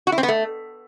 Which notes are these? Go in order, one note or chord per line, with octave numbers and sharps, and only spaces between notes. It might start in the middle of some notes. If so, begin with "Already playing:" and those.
F#4
E4
C4
B3
A3